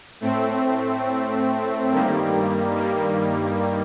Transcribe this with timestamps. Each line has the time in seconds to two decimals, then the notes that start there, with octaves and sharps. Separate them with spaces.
0.21 A2 A3 C4
1.91 G2 D#3 G3 A#3
2.76 G3 A#3